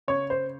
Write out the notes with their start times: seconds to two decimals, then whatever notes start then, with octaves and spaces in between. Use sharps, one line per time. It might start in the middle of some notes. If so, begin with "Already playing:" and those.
0.08 C#3 C#5
0.30 C5